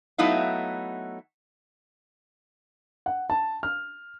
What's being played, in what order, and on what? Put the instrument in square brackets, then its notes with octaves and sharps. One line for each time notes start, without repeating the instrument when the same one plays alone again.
[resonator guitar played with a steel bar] F#3 A3 B3 D#4 E4 F5
[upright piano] F#5
A5
F6